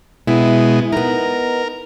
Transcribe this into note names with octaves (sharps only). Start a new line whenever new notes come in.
B2 G#3 E4
B3 D#4 A#4